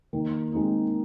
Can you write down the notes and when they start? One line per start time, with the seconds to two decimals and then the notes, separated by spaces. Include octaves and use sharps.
0.13 D#3 A#3
0.52 G#3 C4 D#4